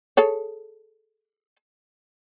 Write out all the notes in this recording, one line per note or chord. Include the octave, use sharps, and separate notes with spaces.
G#4 A4 C#5